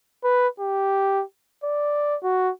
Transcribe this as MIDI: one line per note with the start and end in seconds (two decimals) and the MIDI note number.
0.24 0.48 71
0.60 1.23 67
1.64 2.16 74
2.23 2.51 66